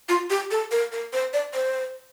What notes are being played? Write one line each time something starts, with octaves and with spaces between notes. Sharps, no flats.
F4
G4
A4
A#4
A#4
C5
D5
C5